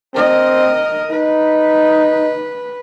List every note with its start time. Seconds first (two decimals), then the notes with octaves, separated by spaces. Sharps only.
0.14 C4 A#4 D#5
1.11 D#4 B4